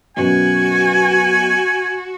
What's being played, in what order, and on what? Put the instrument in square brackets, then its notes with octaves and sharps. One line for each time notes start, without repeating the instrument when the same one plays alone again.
[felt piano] F#2 B2 C#4 [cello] F#4 [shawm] G#5